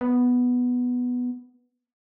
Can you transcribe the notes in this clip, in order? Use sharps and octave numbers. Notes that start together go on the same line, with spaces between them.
B3